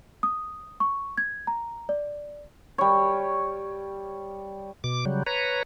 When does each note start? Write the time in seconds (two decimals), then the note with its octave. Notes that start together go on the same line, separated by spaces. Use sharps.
0.23 D#6
0.80 C#6
1.18 G#6
1.47 A#5
1.89 D5
2.78 G3 C#5
4.84 B2 D6
5.05 C#3 F#3 G3
5.27 B4 C#5 A#5